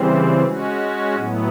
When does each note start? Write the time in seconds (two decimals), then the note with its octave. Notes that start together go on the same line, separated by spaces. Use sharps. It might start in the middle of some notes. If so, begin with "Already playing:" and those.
Already playing: C#3 E3 G3 C4
0.43 G#3 C#4 F#4
1.16 A2 F#3 B3